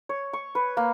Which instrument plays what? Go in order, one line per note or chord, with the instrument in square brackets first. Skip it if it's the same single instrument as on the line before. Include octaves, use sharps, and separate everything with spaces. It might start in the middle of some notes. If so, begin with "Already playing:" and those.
[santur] C#5
C#6
B4
A#3